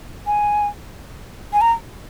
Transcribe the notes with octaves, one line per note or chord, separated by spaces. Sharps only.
G#5
G#5
A#5